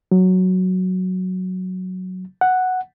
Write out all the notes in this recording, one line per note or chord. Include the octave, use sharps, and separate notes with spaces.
F#3
F#5